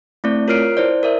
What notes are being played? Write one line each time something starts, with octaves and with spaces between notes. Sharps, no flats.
A3 C4 E4 D5
F4 A#4 C#5 F6 C7 D7
E4 C5 D5
A#4 D5 E5